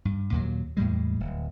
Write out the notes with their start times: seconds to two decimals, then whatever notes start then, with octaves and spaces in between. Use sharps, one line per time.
0.05 G2
0.32 D#2 A#2 F#3
0.77 E2 A2 G3 G#3
1.20 D1